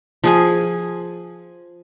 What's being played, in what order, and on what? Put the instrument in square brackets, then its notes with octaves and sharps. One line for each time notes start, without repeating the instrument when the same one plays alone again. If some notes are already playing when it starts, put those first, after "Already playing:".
[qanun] F3 G#4 G#5